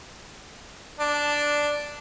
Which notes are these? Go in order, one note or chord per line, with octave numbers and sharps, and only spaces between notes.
D4